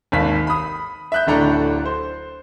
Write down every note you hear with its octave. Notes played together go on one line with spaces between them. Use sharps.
G#1 D#2 B6
B5 D#6
E5 F#6 G6
D1 A2 D3 D4 A4 A#5
C5